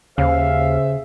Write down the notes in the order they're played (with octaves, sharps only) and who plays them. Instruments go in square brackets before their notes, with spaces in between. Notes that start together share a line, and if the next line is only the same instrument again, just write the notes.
[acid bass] D#2 [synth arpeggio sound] C#3 [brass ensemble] G#4 C5 E5 [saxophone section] F5